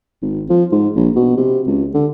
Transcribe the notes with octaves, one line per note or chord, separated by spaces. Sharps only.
G#1
F3
G#2
A#1
B2
C3
C#2
D3